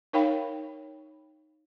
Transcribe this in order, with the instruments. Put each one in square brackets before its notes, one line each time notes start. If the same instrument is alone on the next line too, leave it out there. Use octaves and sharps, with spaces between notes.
[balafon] D#4 A#4 C#5 F5 G5 B5